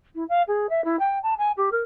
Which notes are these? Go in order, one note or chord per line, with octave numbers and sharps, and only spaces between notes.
E4
F5
G#4
E5
E4
G5
A5
G#5
G4
A#4